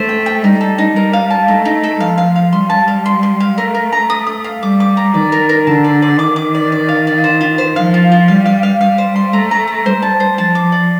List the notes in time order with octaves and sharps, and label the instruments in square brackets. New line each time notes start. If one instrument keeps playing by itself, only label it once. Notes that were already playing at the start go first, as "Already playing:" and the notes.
Already playing: [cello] A3 [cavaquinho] C5
[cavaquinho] G5
G5
[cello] G3 [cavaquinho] D#4
[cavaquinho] A4
D#4
[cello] G3 [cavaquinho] A#4
[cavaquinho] F5
A5
[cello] A3 [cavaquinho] D#4
[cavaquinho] D#4
A4
[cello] F3 [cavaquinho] F5
[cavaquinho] F5
F5
[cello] G3 [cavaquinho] C6
[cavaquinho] A5
F5
C6
C6
F5
[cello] A3 [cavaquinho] A#4
[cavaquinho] A#4
A#5
D#6
D#6
F5
[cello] G3 [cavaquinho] D6
[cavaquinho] D6
A#5
[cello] D#3 [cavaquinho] D5
[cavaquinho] A#4
A#4
[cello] D3 [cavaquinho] A5
[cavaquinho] D5
D5
[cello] D#3 [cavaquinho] D6
[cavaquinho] D6
D5
D5
F5
D5
C5
F4
C5
[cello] F3 [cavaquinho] F5
[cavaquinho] F4
F4
[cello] G3 [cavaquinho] F5
[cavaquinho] F5
F5
[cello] G3 [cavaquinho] F5
[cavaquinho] C5
C6
[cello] A3 [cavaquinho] A#5
[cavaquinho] A#5
A#5
[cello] G3 [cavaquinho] C5
[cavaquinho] A5
C5
[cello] F3 [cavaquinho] A5
[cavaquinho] D6
D5